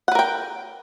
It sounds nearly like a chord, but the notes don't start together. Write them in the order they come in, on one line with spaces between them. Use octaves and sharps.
F#5 B4 A#4 G5